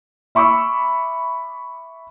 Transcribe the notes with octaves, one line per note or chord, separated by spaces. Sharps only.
E5 B5 C#6 D6 E6